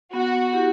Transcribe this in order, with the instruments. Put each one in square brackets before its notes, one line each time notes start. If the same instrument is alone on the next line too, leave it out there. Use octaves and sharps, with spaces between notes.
[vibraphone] B3 [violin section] F#4
[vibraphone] E4 G4